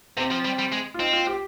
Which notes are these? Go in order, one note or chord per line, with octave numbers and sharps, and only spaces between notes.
C3 C4
F3
G3
G3
G#3
F4
C4 D#4
F4
G4